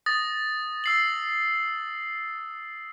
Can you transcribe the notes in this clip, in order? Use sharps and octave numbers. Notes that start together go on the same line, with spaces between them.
D#6 A6 A#6
E6 C7 F#7